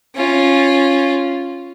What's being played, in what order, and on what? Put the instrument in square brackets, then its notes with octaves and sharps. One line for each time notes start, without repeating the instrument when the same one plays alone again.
[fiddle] C#4 F4